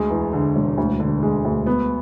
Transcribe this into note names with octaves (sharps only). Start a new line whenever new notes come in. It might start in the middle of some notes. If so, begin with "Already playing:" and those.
Already playing: D2 G#3
E2
D3
E1
D2
D3
G#3
D2
B3